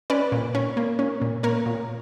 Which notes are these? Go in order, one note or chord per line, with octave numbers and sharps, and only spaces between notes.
C#4 B4 D5
A#2
C#4
A#3
C#4
A#2
A#3 A#4 C#5
A#2